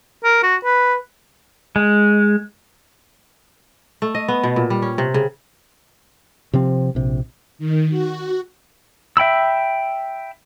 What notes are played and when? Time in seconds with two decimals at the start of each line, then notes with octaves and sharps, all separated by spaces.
0.24 A#4
0.43 F#4
0.64 B4
1.76 G#3
4.02 A3
4.15 D#5
4.28 B3
4.44 B2
4.56 A#2
4.70 G3
4.82 C#4
4.98 C3
5.14 C#3
6.53 C3 F3 C4
6.95 A#1 C3
7.59 D#3
7.90 F#4
9.17 E5 G5 B5 E6